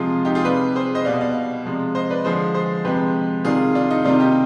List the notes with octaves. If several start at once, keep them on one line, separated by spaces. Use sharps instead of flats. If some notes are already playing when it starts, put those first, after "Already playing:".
Already playing: C3 F3 G#3 F4 G#4
D#4 G4
F4 G#4
C3 G3 G4 B4
G#4 C5
C5 D#5
B2 G3 D5 F5
D5 F5
C3 F3 G#3
C5 D#5
B4 D5
D3 F3 G#3 G#4 C5
G#4 C5
C3 F3 G#3 G4 B4
C3 D#3 G3 F4 G#4
D4 F4
D#4
C3 D#3 G3 D4 F4
D#4 G4